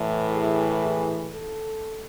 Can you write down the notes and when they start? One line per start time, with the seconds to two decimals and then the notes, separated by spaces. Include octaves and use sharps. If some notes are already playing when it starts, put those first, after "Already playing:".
Already playing: A2 E3
0.32 G#4
0.82 G#4
1.33 A4